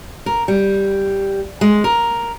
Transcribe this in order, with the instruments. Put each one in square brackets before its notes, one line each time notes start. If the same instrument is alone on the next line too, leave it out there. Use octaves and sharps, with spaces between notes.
[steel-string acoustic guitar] A#4
G3
G#3
A#4